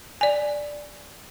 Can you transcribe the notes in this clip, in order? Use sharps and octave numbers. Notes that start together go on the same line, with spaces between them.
D5 G#5